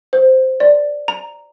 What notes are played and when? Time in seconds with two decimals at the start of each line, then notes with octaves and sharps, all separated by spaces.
0.13 C5
0.60 D5
1.08 A#5